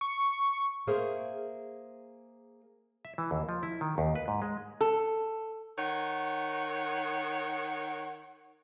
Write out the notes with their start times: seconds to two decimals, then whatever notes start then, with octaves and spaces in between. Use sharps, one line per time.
0.01 C#6
0.87 A#3 G#4 A#4 C5 E5 F5
3.05 E5
3.18 E3
3.31 D#2
3.49 F3
3.63 E4
3.81 D#3
3.98 D#2
4.15 B4
4.28 G#2
4.42 G#3
4.81 A4
5.78 D#3 C#5 F#5